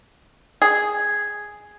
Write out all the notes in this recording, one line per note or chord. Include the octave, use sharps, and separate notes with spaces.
G#4